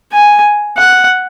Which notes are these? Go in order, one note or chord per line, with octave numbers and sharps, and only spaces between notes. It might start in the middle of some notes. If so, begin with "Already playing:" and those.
G#5
F#5